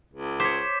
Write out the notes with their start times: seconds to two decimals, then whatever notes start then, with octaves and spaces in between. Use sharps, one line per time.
0.13 C#2
0.40 C5 C#5 D6 B6